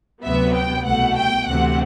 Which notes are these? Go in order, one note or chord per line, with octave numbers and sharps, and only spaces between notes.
D2 C3 F#3 B3 E5
G5
C2 B2 A3 F#5
G5
D2 C3 E3 A3 C4 F#5